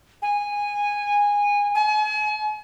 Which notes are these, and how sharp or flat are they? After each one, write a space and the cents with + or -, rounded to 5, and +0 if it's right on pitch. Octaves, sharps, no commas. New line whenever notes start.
G#5 -15
G#5 +40